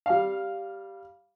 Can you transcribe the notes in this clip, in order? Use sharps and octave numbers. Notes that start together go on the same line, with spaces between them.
G3 F5